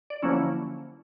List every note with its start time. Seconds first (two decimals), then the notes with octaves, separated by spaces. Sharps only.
0.10 D5
0.22 D3 F3 F#3 A#3 C#4 E4